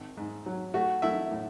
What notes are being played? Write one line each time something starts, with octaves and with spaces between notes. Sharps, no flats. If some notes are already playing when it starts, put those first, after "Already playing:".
Already playing: G#1
G#2
F#3
A3 F#4
A3 E4 E5
A2